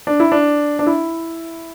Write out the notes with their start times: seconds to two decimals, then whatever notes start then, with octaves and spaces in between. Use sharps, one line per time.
0.07 D4
0.20 E4
0.32 D4
0.79 D4
0.87 E4